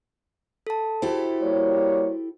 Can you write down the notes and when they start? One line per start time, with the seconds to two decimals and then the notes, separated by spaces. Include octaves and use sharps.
0.67 A4 A5
1.02 E4 F#4 G4 A4 C5
1.42 G3 A#3 C#5